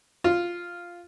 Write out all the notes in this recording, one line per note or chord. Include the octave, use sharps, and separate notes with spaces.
F4